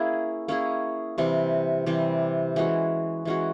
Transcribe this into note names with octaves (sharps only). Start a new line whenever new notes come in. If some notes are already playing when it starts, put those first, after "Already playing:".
Already playing: A#3 C#4 E4 G#4
A#3 C#4 E4 G#4
C3 E3 G3
C3 E3 G3
E3 G#3 C#4 F#4
E3 G#3 C#4 F#4